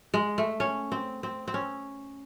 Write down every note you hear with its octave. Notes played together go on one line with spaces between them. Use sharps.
G#3
A3
C#4
C4
C4
C4
C#4